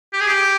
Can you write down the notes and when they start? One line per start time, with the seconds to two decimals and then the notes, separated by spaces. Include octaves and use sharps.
0.13 G4
0.21 G#4
0.28 G4